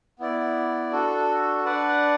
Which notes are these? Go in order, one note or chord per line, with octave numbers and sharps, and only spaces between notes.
B3 E4 D5
D4 F#4 A4
D4 B4 D5 F#5